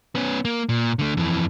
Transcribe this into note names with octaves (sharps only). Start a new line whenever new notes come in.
B3 C#4
A#3
A#2
D3 A3
F2 E3